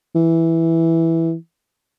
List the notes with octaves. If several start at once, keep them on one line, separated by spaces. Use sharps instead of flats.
E3